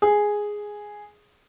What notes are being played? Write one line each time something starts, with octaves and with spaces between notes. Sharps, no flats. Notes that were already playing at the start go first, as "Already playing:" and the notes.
G#4